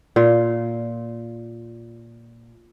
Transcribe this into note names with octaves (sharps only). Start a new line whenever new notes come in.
A#2 F4